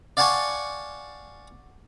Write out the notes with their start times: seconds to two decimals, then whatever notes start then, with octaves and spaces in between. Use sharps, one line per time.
0.17 D5 F5 F#5 G#5 A5 C#6